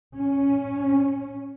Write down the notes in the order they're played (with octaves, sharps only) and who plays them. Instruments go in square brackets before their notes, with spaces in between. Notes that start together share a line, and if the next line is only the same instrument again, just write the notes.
[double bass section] C#4